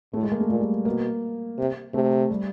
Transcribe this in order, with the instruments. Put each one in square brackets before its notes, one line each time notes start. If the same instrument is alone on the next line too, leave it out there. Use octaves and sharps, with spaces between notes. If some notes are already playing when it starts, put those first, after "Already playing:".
[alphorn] A2 [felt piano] A3
[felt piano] G#3
A#3
A3
[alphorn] A#2 [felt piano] G#3
[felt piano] G3
[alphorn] B2 [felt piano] A#3
[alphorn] C3
[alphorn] C3 [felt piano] A3
[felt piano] G3